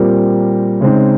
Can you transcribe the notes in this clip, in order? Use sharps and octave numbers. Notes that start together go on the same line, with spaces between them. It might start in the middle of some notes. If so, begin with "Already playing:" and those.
Already playing: A#2 G3 C4 G4 A#4
C#3 G#3 C4 D#4